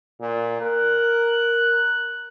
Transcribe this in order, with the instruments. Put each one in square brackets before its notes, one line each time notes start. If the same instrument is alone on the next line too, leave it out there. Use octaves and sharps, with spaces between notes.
[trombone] A#2
[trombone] A#4 [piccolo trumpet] F#6